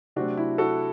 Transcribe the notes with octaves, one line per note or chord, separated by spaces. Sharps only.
C3 F#3 A3 C4 D4 F#4
E4
F#4 A4